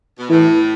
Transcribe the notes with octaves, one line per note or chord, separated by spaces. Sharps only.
B2
A2 E3